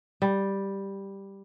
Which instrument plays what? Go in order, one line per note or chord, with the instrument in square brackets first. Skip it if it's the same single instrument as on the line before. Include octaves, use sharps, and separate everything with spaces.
[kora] G3